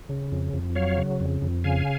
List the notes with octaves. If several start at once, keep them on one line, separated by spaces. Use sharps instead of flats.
C#3
F2
F2
F#3 C#5 F5
C#3
F2
F2
C#3 F5 G#5